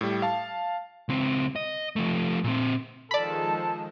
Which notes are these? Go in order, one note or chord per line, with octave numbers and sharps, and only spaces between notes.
A2 G3
F5 A5
C#2 C4
D#5
F3 A3
A#2 C4
D#3 F3 G#3 A4 D5 A5 B5